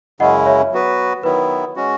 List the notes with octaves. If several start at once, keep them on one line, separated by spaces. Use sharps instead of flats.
F#2 C#3 G#3 C#4 E4 D#5 F#5
C#5 E5
F#3 B3 F#4 B4
D#3 F#3 B3 E4 B4
G#3 C#4 F#4